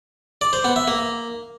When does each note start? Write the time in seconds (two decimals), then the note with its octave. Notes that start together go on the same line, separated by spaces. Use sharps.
0.41 D5
0.53 C5
0.64 B3
0.76 E5
0.88 A#3